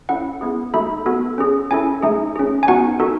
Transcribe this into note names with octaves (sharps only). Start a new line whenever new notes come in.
C#4 E4 A4 F#5
B3 E4 G#4
A3 D#4 F#4 A4 B5
B3 F#4 A4
C#4 G#4
C#4 E4 A4 G#5
A3 D#4 G#4
C#4 G#4
G#5
B3 D#4 F#4 F#5
D#4 F#4 A4